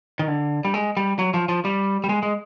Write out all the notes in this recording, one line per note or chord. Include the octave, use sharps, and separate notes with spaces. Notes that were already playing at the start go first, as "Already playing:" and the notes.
D#3
D3
G3
G#3
G3
F#3
F3
F3
G3
G3
G#3
G#3